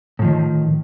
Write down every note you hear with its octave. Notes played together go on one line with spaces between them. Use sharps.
A2 D#3 F3